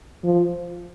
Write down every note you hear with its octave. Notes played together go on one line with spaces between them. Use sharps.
F3